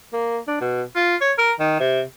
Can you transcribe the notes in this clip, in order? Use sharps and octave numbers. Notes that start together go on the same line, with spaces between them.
A#3
D4
B2
F4
C#5
A#4
D#3
C3